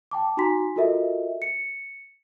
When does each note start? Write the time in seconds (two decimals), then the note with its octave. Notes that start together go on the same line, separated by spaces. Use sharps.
0.11 G5 A5 D6
0.37 D#4 F#4 G#5 A#5 C6 B6
0.76 F4 F#4 A4 A#4 D#5 E5
1.42 C#7